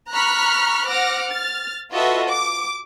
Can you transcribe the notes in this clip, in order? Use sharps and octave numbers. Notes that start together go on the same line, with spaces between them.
A#5 B5 C#6 F6 F#6 B6
C5 F#5 D6 F6 A#6
F6 A6
F4 F#4 A4 B4 D#5 E5
D6